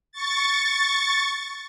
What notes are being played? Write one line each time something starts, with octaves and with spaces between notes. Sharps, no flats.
C#6 A6